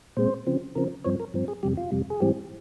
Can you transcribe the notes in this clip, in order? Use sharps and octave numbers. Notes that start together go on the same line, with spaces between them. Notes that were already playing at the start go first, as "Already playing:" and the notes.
A#2 G#3 C4 C5
C#3 F3 C4
C#3 F3 C4 A#4
G2 F3 C4 C#5
A#4
G2 F3 C4
G#4
F2 C3 G3 G4
F4
F2 C3 G3
G#4
G#2 E3 G3 C4 G4